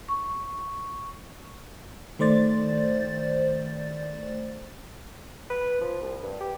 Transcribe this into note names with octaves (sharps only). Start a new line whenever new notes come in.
C#6
D#3 A3 C5 D5 A6
B4
F3
C2
G2
G4